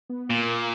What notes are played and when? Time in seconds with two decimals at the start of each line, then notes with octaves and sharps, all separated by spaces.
0.10 B3
0.30 A#2 A#3